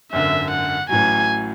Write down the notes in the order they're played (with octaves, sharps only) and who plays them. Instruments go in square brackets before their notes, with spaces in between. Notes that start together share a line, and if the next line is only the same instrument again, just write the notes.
[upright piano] G#1 F#2 D3 [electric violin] E5
[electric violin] F#5
[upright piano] A1 A2 F#3 [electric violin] G#5